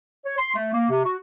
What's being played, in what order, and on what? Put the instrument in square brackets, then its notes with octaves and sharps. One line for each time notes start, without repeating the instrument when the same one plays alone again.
[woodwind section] C#5
C6
A3
A#3
C3
F#4